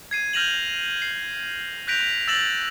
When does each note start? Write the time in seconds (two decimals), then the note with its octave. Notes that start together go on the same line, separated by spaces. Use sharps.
0.11 G#6 C7 D#7
0.33 F6 G6 A#6 D#7 F7 F#7
1.02 C7
1.88 F#6 G6 A#6 B6 D7 F7
2.28 E6 A6 A#6 E7 F#7